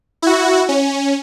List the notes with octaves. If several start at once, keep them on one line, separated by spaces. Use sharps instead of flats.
E4 F#4
C#4